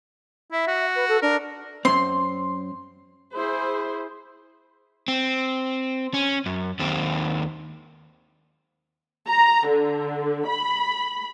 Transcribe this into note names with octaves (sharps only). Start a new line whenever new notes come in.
E4 E5
F#4
B4
A4
D4 A#4
F#2 C4 C6
E4 G#4 C5
C4
C#4
F#2
D#2 C4
A#5
D3
B5